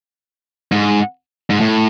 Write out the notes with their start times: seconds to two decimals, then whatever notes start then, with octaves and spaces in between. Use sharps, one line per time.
0.72 G#2
1.50 G#2
1.60 A2